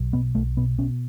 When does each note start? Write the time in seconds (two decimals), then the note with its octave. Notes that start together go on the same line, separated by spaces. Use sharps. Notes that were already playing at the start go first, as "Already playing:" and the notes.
Already playing: B1
0.13 B2 B3
0.35 B1 A3
0.57 B2 B3
0.78 B2 C#4